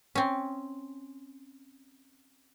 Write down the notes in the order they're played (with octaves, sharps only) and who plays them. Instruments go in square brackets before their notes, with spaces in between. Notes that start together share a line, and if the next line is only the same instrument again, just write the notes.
[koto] C4 C#4